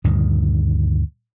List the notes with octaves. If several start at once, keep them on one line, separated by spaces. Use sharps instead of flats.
D2 G2 A#2 D#3